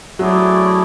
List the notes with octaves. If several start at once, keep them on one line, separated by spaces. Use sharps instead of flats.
F#3 A3 C#4 E4 G#4 D5